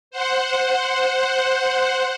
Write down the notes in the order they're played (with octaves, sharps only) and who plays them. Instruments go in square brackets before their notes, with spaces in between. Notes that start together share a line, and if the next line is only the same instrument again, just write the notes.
[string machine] C5 F#5